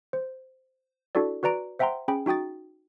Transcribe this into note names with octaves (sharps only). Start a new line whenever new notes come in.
C5
D4 E4 F#4 A4 D5
F#4 B4 D5 A#5 D7
C5 E5 F#5 G5 A#5 C6
C#4 G#4 G5 B5
D#4 F#4 G5 D#6 A6